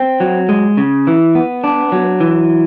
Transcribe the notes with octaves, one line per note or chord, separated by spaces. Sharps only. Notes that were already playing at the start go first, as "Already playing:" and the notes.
Already playing: C4
F#3
G#3
C#3
E3
B3
D4
F#3
E3